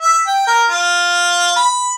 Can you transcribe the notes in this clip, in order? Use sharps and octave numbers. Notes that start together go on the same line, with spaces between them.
E5
G5
A#4
F4
B5